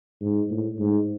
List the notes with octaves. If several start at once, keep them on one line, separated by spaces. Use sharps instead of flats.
G#2
A2
G#2